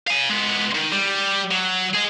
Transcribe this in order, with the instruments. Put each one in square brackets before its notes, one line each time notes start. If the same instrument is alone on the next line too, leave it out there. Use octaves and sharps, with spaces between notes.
[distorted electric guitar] F5 G#5
G#3 B3
D#3
G3
F#3
G#4 D#5